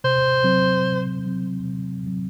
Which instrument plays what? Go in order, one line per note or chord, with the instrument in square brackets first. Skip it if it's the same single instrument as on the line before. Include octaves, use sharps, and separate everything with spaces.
[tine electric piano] C3 [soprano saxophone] C5
[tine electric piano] F#3 C4
C3
F#3 C4
C3
F#3 C4